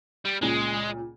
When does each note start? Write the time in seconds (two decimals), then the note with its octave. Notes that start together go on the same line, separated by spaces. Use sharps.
0.25 G3
0.41 C#2 A#2 C#3 G#3